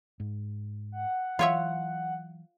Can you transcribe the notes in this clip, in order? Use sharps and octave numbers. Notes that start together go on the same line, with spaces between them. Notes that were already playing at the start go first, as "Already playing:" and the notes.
G#2
F#5
E3 F#3 F4 C#5 E5